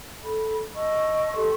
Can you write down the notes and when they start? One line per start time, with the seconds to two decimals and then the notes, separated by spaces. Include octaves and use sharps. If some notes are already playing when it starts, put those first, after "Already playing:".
0.23 A4 B5
0.75 D#5 A5 C#6 E6
1.35 G4 A4 C6 C#6